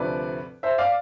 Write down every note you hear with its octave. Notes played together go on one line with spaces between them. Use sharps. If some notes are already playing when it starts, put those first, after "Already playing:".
Already playing: D2 C3 F3 B4 D5
C5 E5
D5 F5